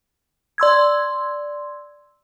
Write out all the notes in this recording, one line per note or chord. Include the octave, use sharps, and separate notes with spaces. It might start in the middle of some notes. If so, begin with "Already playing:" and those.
D5 C6 E6 G#6